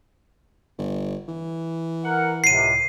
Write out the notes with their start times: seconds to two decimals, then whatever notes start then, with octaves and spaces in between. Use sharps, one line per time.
0.78 G1
1.28 E3
2.03 A#4 F#5
2.44 C#2 A2 C3 C7 D#7